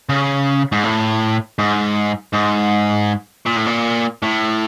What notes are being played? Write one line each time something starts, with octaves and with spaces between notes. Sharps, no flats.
C#3
G#2
A2
G#2
G#2
A#2
A2
A#2
A2